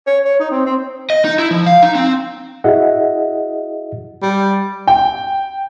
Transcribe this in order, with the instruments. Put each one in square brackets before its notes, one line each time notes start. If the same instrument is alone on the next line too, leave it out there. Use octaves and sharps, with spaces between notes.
[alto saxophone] C#5
C#5
D#4
C4
C4
[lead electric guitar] D#5
D#4
E4
F3
F5
D#4
C4
[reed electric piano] E4 F#4 G#4 D#5 E5 F#5
[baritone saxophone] G3
[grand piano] G5